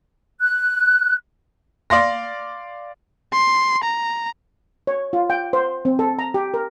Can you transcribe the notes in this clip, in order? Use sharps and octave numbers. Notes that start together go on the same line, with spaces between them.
F#6
D5 F5 C6 A#6
C6
A#5
C#5
F4
G5
C5
C4
A4
A#5
G4
A#4